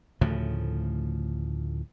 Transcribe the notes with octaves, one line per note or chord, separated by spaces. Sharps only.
D2 A2 C#3 F3